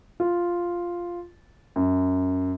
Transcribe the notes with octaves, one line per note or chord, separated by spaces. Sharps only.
F4
F#2